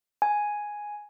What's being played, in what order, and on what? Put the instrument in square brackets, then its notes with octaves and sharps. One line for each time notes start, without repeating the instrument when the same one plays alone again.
[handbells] G#5